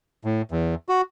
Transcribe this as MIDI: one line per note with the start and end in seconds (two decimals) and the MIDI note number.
0.25 0.42 45
0.51 0.75 40
0.89 1.02 66